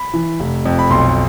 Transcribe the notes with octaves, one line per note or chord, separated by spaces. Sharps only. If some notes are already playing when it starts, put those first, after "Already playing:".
Already playing: B5
E3
F1
F2
B5
B1 C6